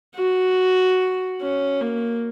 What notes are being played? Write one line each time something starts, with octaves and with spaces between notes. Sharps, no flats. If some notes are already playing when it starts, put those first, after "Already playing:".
F#4
C#4
A#3